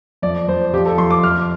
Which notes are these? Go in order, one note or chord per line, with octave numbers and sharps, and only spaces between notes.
F2 D5
F2 C5
F3 G4
A4
F2 C6
D6
F2 F6